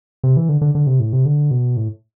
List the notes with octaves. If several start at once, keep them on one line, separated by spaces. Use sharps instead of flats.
C3
E3
D3
D3
D3
C3
A2
C3
D3
B2
A2